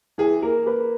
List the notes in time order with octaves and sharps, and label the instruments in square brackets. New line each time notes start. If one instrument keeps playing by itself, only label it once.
[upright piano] E3 G#4
A#3 A#4
A#3 B4